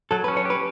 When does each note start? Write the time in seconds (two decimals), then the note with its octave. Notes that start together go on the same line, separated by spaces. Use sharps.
0.11 F#3 A4
0.24 B4
0.28 C#4
0.37 C#5
0.45 G4 B4